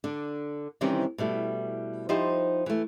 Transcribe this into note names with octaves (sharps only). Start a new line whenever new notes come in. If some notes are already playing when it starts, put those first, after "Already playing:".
D3 D4
C3 D#3 E3 G3 C4 C#4
B2 G3 A3 E4
F3 D#4 E4 G4 C5
E3 A3